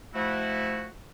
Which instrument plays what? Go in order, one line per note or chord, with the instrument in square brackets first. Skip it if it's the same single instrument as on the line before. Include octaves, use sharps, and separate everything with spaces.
[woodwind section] F3 A3 E4 F#4